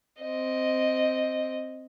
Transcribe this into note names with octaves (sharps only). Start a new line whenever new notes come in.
C4 D#5